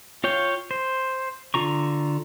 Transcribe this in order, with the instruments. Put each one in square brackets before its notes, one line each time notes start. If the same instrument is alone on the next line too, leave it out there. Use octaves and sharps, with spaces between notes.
[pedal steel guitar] F4 C#5 F5 G5
C5
D3 F4 A#5 C#6